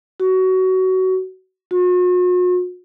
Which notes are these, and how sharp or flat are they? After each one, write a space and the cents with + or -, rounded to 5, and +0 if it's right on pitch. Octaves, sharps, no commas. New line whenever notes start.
F#4 +20
F#4 -45